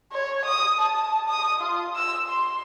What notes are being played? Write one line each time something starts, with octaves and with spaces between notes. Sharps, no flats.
C#5
D#6
A5
D#6
F4
E6
C6